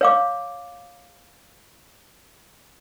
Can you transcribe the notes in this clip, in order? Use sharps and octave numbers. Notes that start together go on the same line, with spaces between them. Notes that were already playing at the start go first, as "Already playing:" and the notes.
C#5 F5 D6